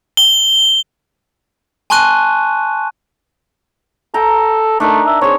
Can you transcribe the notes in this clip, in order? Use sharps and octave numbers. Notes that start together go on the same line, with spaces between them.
G7
G#5 A5 C6 C#6 F#6 D#7
A4 G5 A#5
A3 D4 D#4 A#4
E5
C4 G#4 C#5